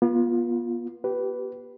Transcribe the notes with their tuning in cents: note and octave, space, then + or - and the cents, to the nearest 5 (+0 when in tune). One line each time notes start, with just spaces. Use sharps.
B3 -35 F4 +0
G4 -25 B4 +0